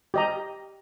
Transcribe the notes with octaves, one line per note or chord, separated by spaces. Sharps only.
G4 D#5 A#5